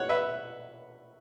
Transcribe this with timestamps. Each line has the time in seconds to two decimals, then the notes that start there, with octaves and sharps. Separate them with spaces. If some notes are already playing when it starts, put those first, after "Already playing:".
Already playing: C#5 F#5
0.09 B4 E5